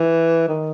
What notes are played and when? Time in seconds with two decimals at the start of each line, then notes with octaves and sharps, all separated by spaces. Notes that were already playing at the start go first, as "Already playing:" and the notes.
Already playing: E3
0.48 D#3